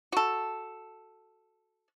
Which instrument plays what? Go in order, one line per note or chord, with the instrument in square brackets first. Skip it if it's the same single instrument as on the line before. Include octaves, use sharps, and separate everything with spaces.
[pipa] F#4 A4